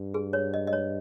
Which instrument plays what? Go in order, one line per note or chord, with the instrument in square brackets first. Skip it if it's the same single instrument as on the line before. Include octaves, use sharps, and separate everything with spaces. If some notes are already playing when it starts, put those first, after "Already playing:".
Already playing: [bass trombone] G2
[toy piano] G#4
C#5
D#5
D#5
C#5